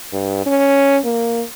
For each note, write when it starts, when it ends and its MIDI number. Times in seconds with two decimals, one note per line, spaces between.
0.12 0.44 43
0.46 0.99 61
1.04 1.42 58